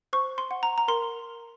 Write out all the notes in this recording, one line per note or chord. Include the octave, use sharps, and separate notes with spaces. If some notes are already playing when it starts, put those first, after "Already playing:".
C5 C#6
C6
F#5
A#5
A#5
A#4 C6